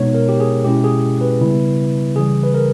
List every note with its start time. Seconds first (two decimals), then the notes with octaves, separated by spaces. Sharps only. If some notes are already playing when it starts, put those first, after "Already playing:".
Already playing: B2 G#3 B3 D#4 C#5
0.14 A#4
0.29 G4
0.40 G#4
0.64 B2 G#3 C#4 E4 G4
0.84 G#4
1.21 B4
1.41 C#3 G3 B3 E4
2.16 C#3 E3 G3 G#4
2.43 B4
2.54 A#4